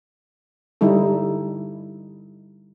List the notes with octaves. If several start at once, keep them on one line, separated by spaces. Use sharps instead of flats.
D3 G3 D#4 E4 A4